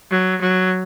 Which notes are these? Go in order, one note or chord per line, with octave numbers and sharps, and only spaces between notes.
F#3
F#3